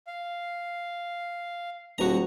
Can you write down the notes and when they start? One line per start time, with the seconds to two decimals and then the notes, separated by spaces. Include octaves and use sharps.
0.07 F5
1.98 D#1 F#4 A#5